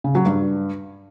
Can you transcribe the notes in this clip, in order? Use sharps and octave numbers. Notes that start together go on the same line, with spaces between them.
C#3
F#3
G2